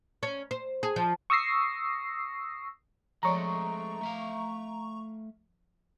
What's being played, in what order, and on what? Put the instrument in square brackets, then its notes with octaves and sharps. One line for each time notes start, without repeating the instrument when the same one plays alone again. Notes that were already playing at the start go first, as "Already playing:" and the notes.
[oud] C#4
C5
G#4
F3
[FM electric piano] C#6 D#6 E6 A#6 C7
[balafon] F3 C#5 D5 [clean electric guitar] G#3 A3 C4 [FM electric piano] A#5 C#6
[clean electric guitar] A3 E5 F5